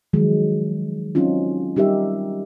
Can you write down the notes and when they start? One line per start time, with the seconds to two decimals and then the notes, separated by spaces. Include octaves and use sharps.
0.13 D#3 F3 F#3 G#3
1.15 F#3 C4 C#4 D#4 F4
1.76 G3 D#4 G4 A#4 E5